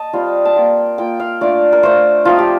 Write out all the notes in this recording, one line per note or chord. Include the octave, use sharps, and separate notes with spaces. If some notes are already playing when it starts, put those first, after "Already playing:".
Already playing: D#5 A5
G3 C4 F4
A5
A#3 F4 G5
A#3 F4 G5
F5
A3 D4 F4 D5
A#4
A3 D4 F4 C5
F3 C4 D#4 F4
G4